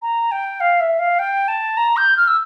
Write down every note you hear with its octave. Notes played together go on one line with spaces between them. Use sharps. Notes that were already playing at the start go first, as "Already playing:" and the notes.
A#5
G5
F5
E5
F5
G5
A5
A#5
G6
F6
E6